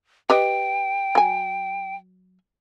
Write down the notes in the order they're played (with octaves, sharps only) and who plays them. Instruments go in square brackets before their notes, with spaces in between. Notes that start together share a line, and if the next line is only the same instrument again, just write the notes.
[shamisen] G4 B4 D#5 [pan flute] G5
[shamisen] F#3 G#5